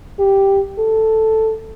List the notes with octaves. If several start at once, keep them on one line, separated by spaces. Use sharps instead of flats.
G4
A4